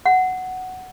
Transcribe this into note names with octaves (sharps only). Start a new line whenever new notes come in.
F#5